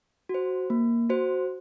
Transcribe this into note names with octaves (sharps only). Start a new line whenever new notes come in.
F#4
C5
A#3
F#4 C5